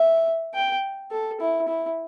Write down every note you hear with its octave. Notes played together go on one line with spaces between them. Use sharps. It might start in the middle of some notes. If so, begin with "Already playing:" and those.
Already playing: E5
G5
A4
E4
E4